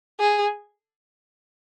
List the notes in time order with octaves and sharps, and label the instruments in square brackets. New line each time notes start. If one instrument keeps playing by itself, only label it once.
[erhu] G#4